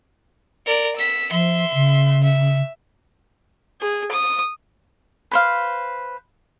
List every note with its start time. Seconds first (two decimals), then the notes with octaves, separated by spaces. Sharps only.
0.66 A#4 D5
0.96 E6 B6
1.32 F3 E5 C6
1.74 C#3
2.23 E5
3.81 G#4
4.11 D#6
5.31 B4 C5 F5